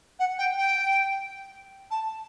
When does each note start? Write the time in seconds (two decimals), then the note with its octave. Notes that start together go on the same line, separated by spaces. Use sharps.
0.19 F#5
0.38 G5
0.58 G5
1.91 A5